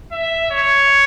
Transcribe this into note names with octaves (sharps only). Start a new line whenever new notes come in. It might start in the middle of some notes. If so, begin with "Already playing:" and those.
E5
C#5